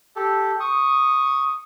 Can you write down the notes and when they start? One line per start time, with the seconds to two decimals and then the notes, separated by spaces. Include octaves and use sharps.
0.16 G4 A4
0.60 C#6 D#6